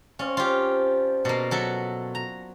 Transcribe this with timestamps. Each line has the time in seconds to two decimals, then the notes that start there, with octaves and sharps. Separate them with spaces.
0.19 C4 C#4 D5 F5
0.37 F3 F4 G4
1.25 B2 A#3 A5 C#6
1.51 F#3 A4 E5
2.15 A#5